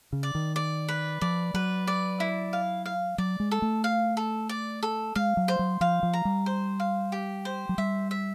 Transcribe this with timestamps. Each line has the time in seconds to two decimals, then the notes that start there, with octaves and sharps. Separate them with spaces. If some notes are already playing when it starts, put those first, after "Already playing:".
0.13 C#3
0.23 D5
0.35 D#3
0.56 D5
0.88 B4
1.21 F3 D5
1.54 F#3 B4
1.87 D5
2.20 E4
2.53 F5
2.86 F5
3.18 F#3 D5
3.40 G#3
3.51 A4
3.62 A3
3.84 F5
4.17 A4
4.49 D5
4.83 A4
5.15 G#3 F5
5.37 F#3
5.48 C5
5.59 F#3
5.81 F3 F5
6.03 F3
6.13 A#5
6.25 G3
6.46 C5
6.80 F5
7.12 G4
7.45 C5
7.69 F#3
7.78 G3 E5
8.11 E5